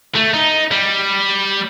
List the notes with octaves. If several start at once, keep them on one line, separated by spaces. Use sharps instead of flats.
A3
D#4
G3